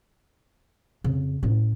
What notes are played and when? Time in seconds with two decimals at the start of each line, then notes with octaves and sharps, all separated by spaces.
1.04 F2 C#3
1.43 A2 C#4